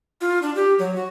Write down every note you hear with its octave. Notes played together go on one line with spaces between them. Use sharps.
F4
D4
G4
F#3
F#4